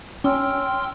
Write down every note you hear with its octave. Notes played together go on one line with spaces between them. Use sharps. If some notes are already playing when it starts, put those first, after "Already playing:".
C#4 G5 C6 E6 F6